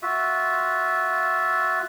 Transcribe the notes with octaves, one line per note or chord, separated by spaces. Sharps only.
F4 F#4 E5